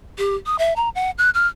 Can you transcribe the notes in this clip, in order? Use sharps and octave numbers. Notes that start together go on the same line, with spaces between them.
G4
D#6
E5
A#5
F#5
F#6
F6